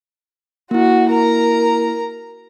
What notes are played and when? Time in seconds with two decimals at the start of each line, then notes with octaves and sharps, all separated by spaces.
0.71 A#3 E4 F#4
1.10 A#4 A#5